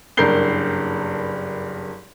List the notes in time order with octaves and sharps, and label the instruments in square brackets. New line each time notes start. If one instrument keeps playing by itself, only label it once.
[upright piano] F#1 G2 A#4 G6 C7 G7